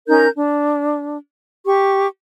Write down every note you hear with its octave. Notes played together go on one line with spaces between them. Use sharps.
C#4 D#4 A#4 G6
D4
G4 C#6